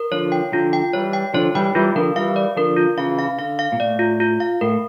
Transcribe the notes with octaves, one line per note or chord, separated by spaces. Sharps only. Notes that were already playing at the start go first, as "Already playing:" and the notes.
Already playing: A#4
D3 F3 C#5
G5
D3 F3 F4
G5
E3 G3 C#5
G5
D3 F3 C#5
E3 G3 G5
E3 G3 F4
D3 F3 A#4
E3 G3 F5
D5
D3 F3 A#4
F4
C#3 E3 F5
F5
D3 F5
F5
A#2
A2 D5
F4
F4
F5
A2 A#4